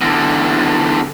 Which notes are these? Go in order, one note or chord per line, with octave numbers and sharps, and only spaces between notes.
E2 D3